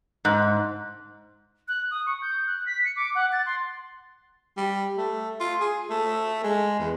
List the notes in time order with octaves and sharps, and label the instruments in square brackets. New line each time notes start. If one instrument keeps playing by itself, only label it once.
[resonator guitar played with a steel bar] G#2
[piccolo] F#6
D#6
C#6
G6
F#6
B6
C#7
D6
F#5
A6
C6
[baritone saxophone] G3
A3
F4
G#4
A3
G#3
E2